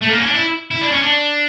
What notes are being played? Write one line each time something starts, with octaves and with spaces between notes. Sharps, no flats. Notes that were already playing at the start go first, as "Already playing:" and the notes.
A3
A#3
C#4
D4
E4
E4
D4
C#4
D4